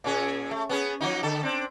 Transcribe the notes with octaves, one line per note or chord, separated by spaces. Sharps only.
A#2 C#4 G#4
A3
B3 C#4 G#4
F3 F#3 D#4
D3 A4
C4 D4